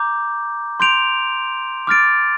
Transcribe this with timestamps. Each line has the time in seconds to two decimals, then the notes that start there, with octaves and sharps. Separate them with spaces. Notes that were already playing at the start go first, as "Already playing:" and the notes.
Already playing: A#5 D6 G6
0.80 C6 G6 D7 F7
1.87 D6 F6 A6 D7